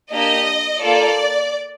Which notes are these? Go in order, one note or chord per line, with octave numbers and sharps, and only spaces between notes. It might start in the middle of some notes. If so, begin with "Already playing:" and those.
A#3 D4 G4 D#5
A#3 F4 A4 D5